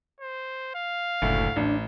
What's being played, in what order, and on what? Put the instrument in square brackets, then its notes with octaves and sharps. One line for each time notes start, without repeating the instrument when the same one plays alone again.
[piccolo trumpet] C5
F5
[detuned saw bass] F#1 [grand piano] D2 A2 D3
[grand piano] A1 [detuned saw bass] D4